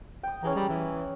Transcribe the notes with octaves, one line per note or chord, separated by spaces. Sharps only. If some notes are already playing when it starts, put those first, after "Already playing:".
G5 D#6
E3 C#4 G#4 A#5
G3 D#5
E3